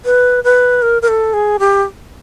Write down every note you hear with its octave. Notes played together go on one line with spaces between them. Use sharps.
B4
B4
A#4
A#4
A4
G#4
G4